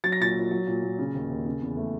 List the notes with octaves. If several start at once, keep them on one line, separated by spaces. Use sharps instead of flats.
F#3 A6
A#6
A#2 A6
A#2
F#3
A#2
A#2
C#3
D#2
D#2
C#3
E2
A3